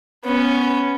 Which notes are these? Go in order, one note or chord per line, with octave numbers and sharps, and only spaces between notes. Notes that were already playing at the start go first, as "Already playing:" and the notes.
B3 C#4